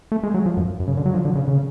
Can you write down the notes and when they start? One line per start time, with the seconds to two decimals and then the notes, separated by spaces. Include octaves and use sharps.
0.12 A3
0.23 G#3
0.34 F#3
0.46 F3
0.57 F#2
0.80 F#2
0.88 C#3
0.97 D3
1.06 F#3
1.13 F3
1.25 D3
1.35 C#3
1.48 C#3